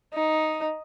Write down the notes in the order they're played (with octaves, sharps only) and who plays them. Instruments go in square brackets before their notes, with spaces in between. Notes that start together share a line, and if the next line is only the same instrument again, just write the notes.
[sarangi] D#4